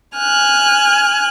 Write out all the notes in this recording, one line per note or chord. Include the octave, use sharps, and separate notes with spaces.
G#5 F6 F#6